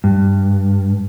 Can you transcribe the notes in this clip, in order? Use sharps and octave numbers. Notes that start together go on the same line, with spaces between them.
G2